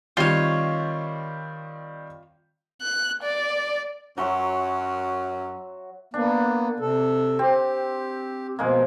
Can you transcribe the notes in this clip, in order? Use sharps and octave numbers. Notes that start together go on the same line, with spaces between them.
D#3 G3 C4 F4 C#5
F#6
D5
F#2 F#3 C#4 E5 C6
A#3 B3 D4
C3 A4
C4 G4
B2 F3 G#3 A#3